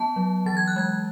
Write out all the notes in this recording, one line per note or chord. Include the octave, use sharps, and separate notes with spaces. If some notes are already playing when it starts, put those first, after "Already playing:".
Already playing: B3 A5
F#3
E3 A6
G#6
F#6
G#3 G#6